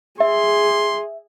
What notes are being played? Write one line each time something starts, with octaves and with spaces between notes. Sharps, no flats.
G#4 E5 C6